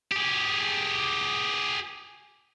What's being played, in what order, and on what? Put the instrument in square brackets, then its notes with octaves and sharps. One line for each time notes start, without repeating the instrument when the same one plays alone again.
[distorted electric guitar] G4 G#4